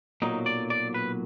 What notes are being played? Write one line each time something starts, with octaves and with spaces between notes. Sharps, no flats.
B1 A#2 F#3 D#4
D5
D5
B4